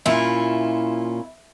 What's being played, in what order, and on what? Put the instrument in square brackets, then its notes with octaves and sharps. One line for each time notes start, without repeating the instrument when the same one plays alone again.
[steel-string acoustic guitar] A#2 C#4 F4 [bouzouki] E4